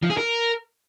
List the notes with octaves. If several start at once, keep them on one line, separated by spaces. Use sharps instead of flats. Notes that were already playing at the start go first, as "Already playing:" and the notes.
F3
G#4
A#4